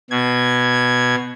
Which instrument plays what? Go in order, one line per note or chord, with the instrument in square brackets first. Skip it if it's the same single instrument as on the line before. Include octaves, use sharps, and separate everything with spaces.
[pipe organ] B2 G#6